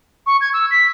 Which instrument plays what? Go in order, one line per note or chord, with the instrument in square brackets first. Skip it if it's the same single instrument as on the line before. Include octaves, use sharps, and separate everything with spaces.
[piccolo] C#6
G#6
E6
B6